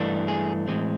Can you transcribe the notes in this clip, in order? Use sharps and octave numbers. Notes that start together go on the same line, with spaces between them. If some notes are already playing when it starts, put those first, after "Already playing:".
Already playing: G2 E3 A3 D4
G#4
A2 E3 G#3 C4